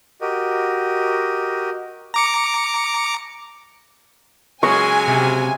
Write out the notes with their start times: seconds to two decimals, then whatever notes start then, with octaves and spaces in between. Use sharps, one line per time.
0.21 F#4 G4 A#4 D#5
2.14 A#5 D6 C#7
4.63 C#3 F#3 G#3 G#5 C#6
5.08 C3